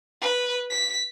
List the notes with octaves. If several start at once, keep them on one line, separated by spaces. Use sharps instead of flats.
B4
B6